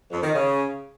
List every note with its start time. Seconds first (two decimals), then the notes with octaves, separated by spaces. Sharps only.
0.11 F2
0.23 D#3
0.34 C#3